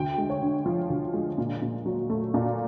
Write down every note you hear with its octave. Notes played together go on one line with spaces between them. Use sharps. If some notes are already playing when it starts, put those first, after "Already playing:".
Already playing: D2 G5
G#3
C#5
D3
F3
D2
G#3
A#2
A#2
F#3
A3
A#2